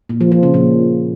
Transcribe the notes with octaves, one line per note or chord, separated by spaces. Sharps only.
A#2
F3
F3
C#3
A#2